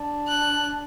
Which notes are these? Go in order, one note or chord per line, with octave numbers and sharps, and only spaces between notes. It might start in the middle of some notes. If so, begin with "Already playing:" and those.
Already playing: D4
F#6